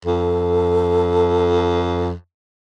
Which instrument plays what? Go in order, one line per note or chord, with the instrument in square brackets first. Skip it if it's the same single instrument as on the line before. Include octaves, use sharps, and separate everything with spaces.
[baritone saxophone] F2 [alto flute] A4